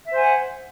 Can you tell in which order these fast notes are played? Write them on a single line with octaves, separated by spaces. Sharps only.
E5 C5 G#5 F#5